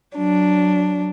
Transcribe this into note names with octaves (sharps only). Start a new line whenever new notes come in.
F#3 D4